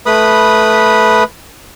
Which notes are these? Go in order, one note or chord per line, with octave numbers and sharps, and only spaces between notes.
A3 B4 B5 D#6